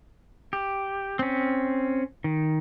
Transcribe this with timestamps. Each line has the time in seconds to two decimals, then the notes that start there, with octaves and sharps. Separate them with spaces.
0.53 G4
1.19 C4 C#4
2.24 D#3